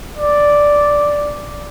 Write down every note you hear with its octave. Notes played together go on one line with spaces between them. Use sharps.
D5